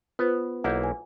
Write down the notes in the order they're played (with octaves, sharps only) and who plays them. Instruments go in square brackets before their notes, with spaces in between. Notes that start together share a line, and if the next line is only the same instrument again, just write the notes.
[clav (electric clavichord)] B3 [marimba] F4 B4 C5
[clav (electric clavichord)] B1 A#3 E4 [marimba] F#5 G6
[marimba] G#5